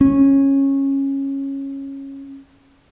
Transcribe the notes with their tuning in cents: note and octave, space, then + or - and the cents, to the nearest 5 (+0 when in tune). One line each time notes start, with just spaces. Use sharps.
C#4 -15